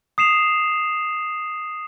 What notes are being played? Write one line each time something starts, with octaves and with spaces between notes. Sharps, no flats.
D#6 C7 E7 F7